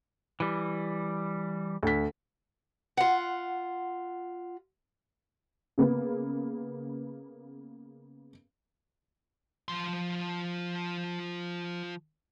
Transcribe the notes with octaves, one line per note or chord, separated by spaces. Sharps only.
E3 G3
D2 B6
F4 F#5
C#3 A#3 B3
F3 C6